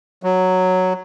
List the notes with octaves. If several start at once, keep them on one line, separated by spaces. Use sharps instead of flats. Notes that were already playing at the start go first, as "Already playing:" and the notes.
F#3